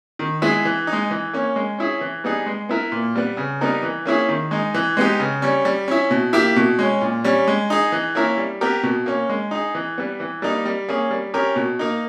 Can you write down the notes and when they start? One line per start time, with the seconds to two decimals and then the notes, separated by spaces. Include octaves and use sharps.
0.19 D#3
0.42 G#3 B3 E4 G#4
0.65 E3
0.87 D#4
0.93 G#3
1.11 E3
1.33 A#3 C#4
1.56 G#3
1.79 C#4 E4 G#4
2.01 E3
2.24 G3 B3 D#4 G#4
2.47 G#3
2.69 B3 E4 A#4
2.92 A#2
3.16 G3 B3
3.37 C#3
3.61 G3 B3 D#4 A#4
3.83 E3
4.05 A#3 C#4 E4 G#4
4.29 D#3
4.51 G#3 D#4
4.74 E3
4.97 G#3 B3 D#4 G4
5.20 C#3
5.42 G3 C#4
5.65 G3
5.88 C#4 E4
6.11 B2
6.33 A#3 E4 G4
6.56 B2
6.79 G#3 C#4
7.01 A#2
7.24 G3 C#4
7.48 G#3
7.70 D#4 G#4
7.92 E3
8.15 A#3 C#4 E4 A#4
8.38 G3
8.61 B3 G4 A#4
8.83 B2
9.06 A#3 C#4
9.30 G#3
9.51 D#4 G#4
9.75 E3
9.98 G3 B3
10.20 E3
10.42 G3 A#3 D#4
10.65 G3
10.89 A#3 C#4 G#4
11.11 G3
11.34 C#4 G4 A#4
11.56 B2
11.79 A#3 D#4